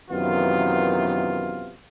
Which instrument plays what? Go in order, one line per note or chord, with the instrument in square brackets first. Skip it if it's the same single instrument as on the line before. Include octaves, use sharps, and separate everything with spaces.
[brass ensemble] F#2 C3 D#3 E3 B3 F4